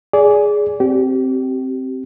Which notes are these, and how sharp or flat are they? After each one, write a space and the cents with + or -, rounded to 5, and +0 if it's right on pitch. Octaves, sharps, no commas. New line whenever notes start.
G#4 +0 D5 -20
C4 +0 G4 -30